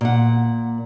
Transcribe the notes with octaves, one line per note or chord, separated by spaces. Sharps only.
A#2 F#5